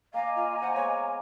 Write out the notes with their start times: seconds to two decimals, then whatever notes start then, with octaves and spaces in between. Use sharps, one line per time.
0.14 A#3 D5 D#5 F5 G#5 A#5
0.36 F4
0.62 C5 F5 F#5
0.75 G#3 B3 C#5 D6